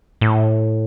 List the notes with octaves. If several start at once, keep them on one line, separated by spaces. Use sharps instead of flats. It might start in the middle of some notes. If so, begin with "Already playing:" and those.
A2